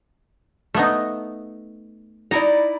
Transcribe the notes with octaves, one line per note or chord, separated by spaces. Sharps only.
A3 B3 D#4
D#4 E4 D5 A#5